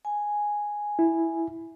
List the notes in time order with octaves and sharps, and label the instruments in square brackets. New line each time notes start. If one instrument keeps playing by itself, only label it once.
[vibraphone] G#5
[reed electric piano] E4